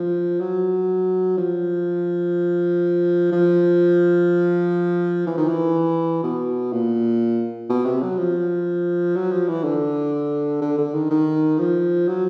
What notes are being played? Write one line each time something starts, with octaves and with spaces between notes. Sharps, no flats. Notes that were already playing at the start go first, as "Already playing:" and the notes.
Already playing: F3
F#3
F3
F3
E3
D#3
E3
B2
A#2
B2
C3
F#3
F3
F#3
F3
E3
D3
D3
D3
D#3
D#3
F3
F#3